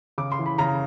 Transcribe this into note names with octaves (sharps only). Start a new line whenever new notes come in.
C#3 D6
C6
E3
B5
C#3 A#5